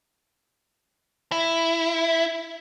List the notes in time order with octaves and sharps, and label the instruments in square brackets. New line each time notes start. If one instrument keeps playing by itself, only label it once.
[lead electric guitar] E4